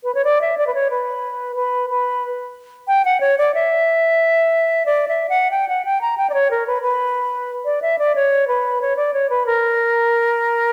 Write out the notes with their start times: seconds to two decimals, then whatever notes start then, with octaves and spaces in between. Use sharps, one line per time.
0.04 B4
0.15 C#5
0.25 D5
0.41 E5
0.58 D5
0.67 B4
0.74 C#5
0.90 B4
1.56 B4
1.90 B4
2.88 G5
3.05 F#5
3.21 C#5
3.38 D5
3.54 E5
4.86 D5
5.08 E5
5.29 F#5
5.51 G5
5.69 F#5
5.85 G5
6.01 A#5
6.18 G5
6.30 D5
6.34 C#5
6.51 A#4
6.67 B4
6.83 B4
7.65 D5
7.82 E5
7.99 D5
8.15 C#5
8.48 B4
8.81 C#5
8.97 D5
9.14 C#5
9.30 B4
9.46 A#4